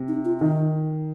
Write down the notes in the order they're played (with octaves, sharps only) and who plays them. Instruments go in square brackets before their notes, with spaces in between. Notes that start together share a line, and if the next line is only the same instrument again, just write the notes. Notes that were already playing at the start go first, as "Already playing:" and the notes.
Already playing: [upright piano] C3
[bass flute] D#4
F4
[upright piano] D#3 [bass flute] D#4